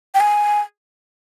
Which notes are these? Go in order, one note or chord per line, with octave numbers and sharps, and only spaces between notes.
G5
G#5